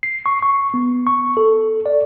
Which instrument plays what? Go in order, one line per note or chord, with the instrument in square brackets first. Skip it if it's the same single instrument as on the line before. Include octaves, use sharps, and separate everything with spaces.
[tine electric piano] C7
C#6
C#6
B3
C#6
A4
D5